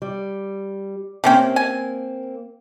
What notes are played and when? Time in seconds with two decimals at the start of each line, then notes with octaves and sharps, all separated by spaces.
0.02 G3
1.24 C3 A#3 C4 C#4 G5
1.56 G#5